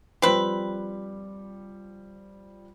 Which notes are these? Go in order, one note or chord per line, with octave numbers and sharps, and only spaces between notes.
F3 G3 C4 B4